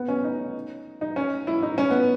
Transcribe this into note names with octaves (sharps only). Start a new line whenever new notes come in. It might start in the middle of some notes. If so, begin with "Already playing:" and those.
Already playing: B3
C#4
D#4
D#4
C#4
E4
D#4
C#4
B3